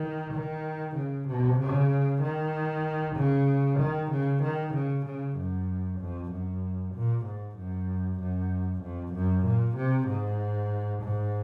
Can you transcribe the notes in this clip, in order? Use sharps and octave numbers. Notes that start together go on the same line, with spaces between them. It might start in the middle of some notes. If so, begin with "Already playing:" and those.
Already playing: D#3
D#3
C#3
C3
C#3
D#3
C#3
D#3
C#3
D#3
C#3
C#3
F#2
F2
F#2
A#2
G#2
F#2
F#2
F2
F#2
A#2
C3
G#2
G#2